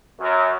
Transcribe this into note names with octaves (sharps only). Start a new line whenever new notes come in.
F#2